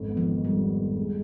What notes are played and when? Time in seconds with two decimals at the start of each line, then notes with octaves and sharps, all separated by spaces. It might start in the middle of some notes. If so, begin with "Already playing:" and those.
Already playing: G#1 F2
0.09 B3
0.17 F3
0.27 D#3
0.44 F2 G3
0.62 B3
0.79 F2
0.96 G#3